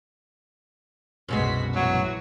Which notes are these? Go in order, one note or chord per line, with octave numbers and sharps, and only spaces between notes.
C2 F#2 B2 G#3 F#4 B6
A#1 E3 F#3 F#4